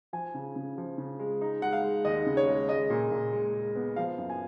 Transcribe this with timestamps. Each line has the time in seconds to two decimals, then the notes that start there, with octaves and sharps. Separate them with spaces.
0.13 F3 G#5
0.34 C#3
0.56 C#3
0.78 F3
0.98 C#3
1.19 G#3
1.41 D#4
1.62 G#3 F#5
1.73 F5
1.84 G#3
2.05 D#2 D#5
2.26 C#3
2.37 C#5
2.47 G#3
2.69 G#3 D#5
2.90 A#2
3.12 A#2
3.33 G#3
3.54 G#3
3.76 B3
3.96 F3 F5
4.18 F#2
4.30 G#5